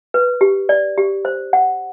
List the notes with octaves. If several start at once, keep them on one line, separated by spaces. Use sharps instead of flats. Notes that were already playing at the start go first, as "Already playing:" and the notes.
B4
G4
D5
G4
C5
F#5